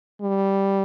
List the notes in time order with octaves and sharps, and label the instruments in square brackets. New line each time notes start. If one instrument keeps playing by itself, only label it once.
[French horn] G3